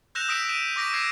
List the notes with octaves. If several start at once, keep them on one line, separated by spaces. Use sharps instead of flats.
E6 F#6 G6 A#6 E7 F7
D#6 E6 B6 D7
D#7 E7
C#6 D6 A#6 B6 D7
E6 G#6 A#6 C7 D#7